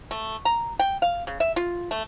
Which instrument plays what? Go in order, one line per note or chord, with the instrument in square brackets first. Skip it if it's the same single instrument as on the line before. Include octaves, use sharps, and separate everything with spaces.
[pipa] A3
A#5
G5
F5
C#3
E5
F4
A3